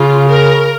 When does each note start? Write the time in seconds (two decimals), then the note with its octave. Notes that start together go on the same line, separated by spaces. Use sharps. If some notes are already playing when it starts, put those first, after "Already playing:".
Already playing: C#3 F4
0.29 A#4